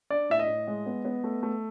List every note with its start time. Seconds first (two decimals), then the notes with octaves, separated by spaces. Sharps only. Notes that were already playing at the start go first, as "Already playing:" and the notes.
0.10 D4 D5
0.30 A2 E5
0.39 D#5
0.48 A2
0.67 G#3
0.86 B3
1.05 B3
1.24 A3
1.43 A3